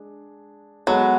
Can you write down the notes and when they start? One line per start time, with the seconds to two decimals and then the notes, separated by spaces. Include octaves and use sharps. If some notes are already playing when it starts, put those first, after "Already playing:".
Already playing: G#3 D4 G#4
0.87 F#3 G#3 B3 F#4 A4